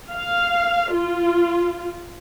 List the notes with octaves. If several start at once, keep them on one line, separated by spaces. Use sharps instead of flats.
F5
F4